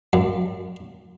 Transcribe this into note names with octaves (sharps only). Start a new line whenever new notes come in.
F#2